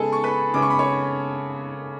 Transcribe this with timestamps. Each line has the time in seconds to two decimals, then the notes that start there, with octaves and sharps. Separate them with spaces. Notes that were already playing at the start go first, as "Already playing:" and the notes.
Already playing: C#3 G#3 B3 G#4 A4 G#5 A5
0.12 C#6
0.23 B4 B5
0.54 C#3 G#3 B3 D6
0.62 C#6
0.70 B5
0.79 C#5 C#6